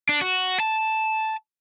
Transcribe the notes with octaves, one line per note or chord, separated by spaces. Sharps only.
D4
F#4
A5